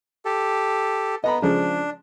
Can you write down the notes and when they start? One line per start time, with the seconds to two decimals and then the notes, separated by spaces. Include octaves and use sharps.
0.25 G4 A4
1.24 B3 D#5 A#5 B5
1.42 C#3 F3 G#3 D4